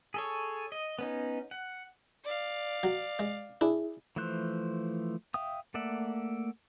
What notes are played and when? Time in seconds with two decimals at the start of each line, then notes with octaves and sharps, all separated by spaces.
0.14 G#4 A4 C#5
0.72 D#5
0.99 B3 C#4 D#4
1.51 F#5
2.24 D5 F5
2.83 F#3
3.19 G#3
3.61 D4 E4 G#4
4.16 E3 F3 A3 C5 F#6
5.34 E5 F5 G5 D#6
5.74 A3 A#3 D5 E5 F#5